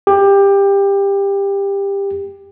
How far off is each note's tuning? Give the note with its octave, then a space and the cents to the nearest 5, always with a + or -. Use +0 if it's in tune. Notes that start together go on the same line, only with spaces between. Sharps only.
G4 +20